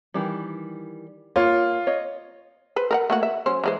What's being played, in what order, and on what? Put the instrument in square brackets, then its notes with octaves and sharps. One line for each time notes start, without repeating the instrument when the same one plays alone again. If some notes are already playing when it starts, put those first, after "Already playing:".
[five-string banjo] D#3 E3 G3
[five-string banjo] A#3 C#5 [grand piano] F4
[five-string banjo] C#5 D#5
[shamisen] B4 C5
A#4 B4 F#5
A3 A#3 F#4
E5
F#3 C#4 C5
E3 G#3 C5